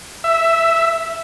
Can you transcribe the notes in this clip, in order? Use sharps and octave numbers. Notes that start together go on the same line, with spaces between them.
E5